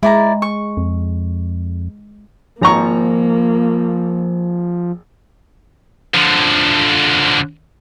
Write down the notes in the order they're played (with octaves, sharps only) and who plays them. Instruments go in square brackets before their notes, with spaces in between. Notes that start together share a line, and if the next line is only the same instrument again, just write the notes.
[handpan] G#3 [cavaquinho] E4 D5 A#5
[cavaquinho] C#6
[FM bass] F2
[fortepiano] G#1 A#5 C#6 [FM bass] F3 [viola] A#3
[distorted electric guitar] D3 F3